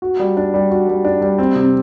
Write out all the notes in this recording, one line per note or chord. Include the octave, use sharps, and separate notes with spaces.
F#4
G3
D4
G3
F#4
G3
D4
G3
C4
C3